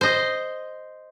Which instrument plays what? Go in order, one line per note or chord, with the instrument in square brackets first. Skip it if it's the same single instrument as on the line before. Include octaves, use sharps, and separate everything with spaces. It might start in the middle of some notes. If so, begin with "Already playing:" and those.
[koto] C5 D#5